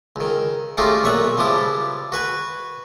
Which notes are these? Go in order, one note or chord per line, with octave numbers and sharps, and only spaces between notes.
C#2 D#3
G#3 A3 C#4 D#4 F4 G4
B1 A#2 C#5 E5 F#5 D#6
C#2 F3 G3 D4 E4 D#6
F#4 B4 G#5